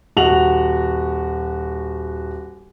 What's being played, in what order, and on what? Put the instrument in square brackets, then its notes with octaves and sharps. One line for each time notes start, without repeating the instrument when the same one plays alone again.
[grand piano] D#1 F#4 F7 F#7